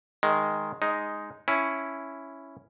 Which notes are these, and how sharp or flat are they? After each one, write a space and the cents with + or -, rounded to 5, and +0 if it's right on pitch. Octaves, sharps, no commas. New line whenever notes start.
D#3 +0 G#3 +0
G#3 +0 D#4 +0
C#4 +0 E4 +5 A5 +0